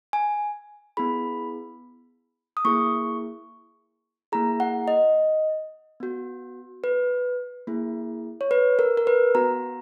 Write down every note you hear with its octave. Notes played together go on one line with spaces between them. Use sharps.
G#5
B3 E4 G#4 B5
D#6
A#3 E4 G#4 C#6
A#3 E4 G#4 A#5
F#5
D#5
B3 F#4
B4
A#3 E4 G#4
C#5
B4
A#4
A#4
B4
B3 F#4 A#5